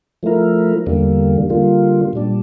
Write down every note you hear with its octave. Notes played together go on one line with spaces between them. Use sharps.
F3 A3 E4 A#4
E2 D3 G3 A#3
D3 G3 A#3 F4
A#2 G3 D4